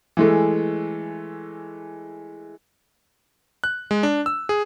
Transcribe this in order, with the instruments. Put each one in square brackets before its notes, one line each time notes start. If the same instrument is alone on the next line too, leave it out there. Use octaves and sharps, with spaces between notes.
[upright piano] E3 G#3 A3
[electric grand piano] F#6
G#3
D4
E6
G#4